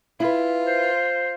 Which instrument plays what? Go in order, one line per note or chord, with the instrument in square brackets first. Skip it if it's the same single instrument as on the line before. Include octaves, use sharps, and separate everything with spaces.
[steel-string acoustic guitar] E4 B4 [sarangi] F4
[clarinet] C5